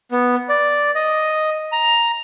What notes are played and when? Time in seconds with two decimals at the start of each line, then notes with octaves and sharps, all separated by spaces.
0.11 B3
0.49 D5
0.95 D#5
1.72 A#5